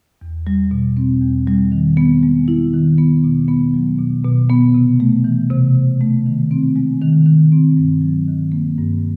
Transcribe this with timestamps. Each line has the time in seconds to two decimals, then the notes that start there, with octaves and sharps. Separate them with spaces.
0.22 E2
0.47 G3
0.71 B2
0.97 C4
1.22 E2
1.47 G3
1.72 D#3
1.97 B3
2.23 G#3
2.48 E4
2.74 D#3
2.98 B3
3.24 B2
3.48 B3
3.74 F#3
3.99 B2
4.24 B2
4.50 B3
4.75 C3
5.00 A3
5.24 E3
5.51 C3
5.75 C3
6.01 A3
6.26 D#3
6.51 C4
6.76 G#3
7.02 D#3
7.26 D#3
7.52 C4
7.77 G2
8.01 F#3
8.28 D#3
8.52 A#3
8.78 G2